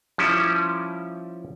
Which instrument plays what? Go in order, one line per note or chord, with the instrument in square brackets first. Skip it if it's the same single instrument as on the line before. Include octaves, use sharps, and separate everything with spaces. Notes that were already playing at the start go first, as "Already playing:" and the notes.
[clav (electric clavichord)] F3 G3 C#4 E4